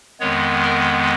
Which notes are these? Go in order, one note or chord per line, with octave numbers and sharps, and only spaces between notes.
F2 D#3 G#3 B3 C#5
A#4